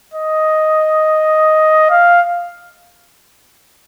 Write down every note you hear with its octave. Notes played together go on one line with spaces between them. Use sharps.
D#5
F5